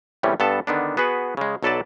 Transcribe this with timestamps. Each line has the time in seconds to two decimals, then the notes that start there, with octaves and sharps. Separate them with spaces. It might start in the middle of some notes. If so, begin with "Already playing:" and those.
0.23 E2 A2 C3 E3 G3 C#4
0.40 G2 B3 A4 A5
0.67 D3 D#3 B3 D4
0.97 B3 F#4 G#4 B4
1.37 C#3 G#3
1.63 B1 F#3 A4 B4 D5 A5